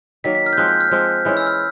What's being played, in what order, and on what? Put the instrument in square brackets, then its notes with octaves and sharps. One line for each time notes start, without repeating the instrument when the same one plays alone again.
[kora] D#3 F#3 A#3 [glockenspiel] B6
[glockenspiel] B6
F6
G6
[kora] F3 G#3 C4 [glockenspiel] F#6
[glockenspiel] G6
F6
[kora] F3 G#3 C4
E3 G#3 C#4 E4
[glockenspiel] E6
F6